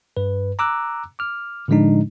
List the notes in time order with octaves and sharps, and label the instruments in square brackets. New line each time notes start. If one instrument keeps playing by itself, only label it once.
[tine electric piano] G2 B4
A#5 D6 E6 F#6
D6 F6
A2 D3 F3 G#3 D4 D#4